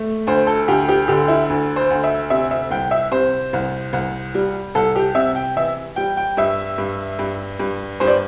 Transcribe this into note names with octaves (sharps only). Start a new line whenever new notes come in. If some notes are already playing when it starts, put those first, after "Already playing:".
Already playing: A3
D2 C5
A4
D2 G4
G4
D3 G4
E4
D2
C5
D2
E5
C3 E5
E5
C2 G5
E5
C3 C5
C2
C2
G3
C2 A4
G4
C3 E5
G5
E3 E5
G3 G5
G5
G2 E5
G2
G2
G2
G2 C5
D5